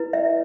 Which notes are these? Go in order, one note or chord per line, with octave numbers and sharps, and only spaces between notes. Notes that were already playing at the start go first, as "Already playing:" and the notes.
Already playing: E4 B4
E5